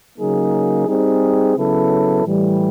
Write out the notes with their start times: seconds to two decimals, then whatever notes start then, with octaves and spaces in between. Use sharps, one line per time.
0.19 C#3 F#3 A#3 D#4 G#4
0.88 G3 C4 D#4 G#4
1.56 C#3 F#3 B3 E4 A4
2.25 A2 E3 G3